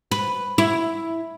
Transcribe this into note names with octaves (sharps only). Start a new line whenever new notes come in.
B4
E4